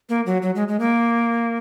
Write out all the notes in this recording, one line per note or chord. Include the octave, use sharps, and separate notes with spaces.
A#3
F#3
F#3
G#3
G#3
A#3